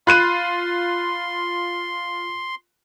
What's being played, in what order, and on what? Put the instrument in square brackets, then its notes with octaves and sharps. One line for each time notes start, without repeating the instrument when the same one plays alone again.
[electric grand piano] F4 [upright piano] B5 F#6 D#7 [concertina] C6